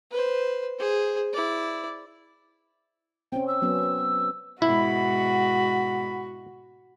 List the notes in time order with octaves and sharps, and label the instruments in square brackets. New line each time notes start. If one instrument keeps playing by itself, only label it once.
[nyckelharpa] B4 C5
G#4 C5
E4 D5
[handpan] C4 C#4 [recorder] G5
[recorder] E6
[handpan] F#3 B3 C#4
[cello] G#2 B2 [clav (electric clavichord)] E4 [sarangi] F#4 [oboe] B5